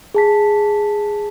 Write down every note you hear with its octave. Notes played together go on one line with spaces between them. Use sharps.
G#4 A5 B6